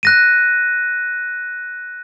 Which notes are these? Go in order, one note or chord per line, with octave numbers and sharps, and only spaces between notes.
F#6 A#6 D#7